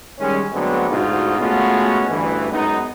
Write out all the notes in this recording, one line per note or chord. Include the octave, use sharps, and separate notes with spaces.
D#3 G3 G#3 C#4
D3 F#3 G#3 A3 B3 C4
D2 G#2 B2 D#4 F4 F#4
G#3 A3 B3 C#4 F4 F#4
A1 D2 G2 E3
F#2 G#3 B3 D#4